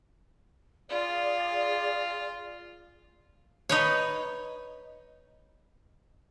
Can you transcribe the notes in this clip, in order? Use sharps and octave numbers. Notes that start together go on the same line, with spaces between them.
F4 G#4 D5
D#4 B4 C#5